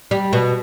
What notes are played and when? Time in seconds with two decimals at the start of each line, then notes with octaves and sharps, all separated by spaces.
0.11 G3
0.33 B2